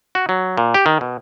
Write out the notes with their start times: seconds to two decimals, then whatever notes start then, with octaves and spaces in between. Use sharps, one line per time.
0.15 F#4
0.29 F#3
0.57 A#2
0.74 G4
0.86 D#3
1.01 B2